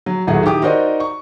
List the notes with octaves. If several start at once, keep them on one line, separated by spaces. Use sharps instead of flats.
F#3
D#1 A1 F#3 A3 G#4 F#5
D#3 E3 G4 D6 D#6
D#4 F#4 A#4 C5 D5 D#5
C#6